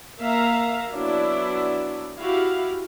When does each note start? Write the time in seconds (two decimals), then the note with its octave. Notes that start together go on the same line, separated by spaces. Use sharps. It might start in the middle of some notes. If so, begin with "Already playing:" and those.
0.20 A#3 E5 F5 A#5
0.93 F#3 B3 D4 E4
2.18 E4 F#4 G4 F5